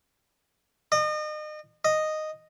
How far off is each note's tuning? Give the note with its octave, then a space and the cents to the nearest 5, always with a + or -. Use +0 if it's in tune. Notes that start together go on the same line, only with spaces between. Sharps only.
D#5 -35
D#5 -5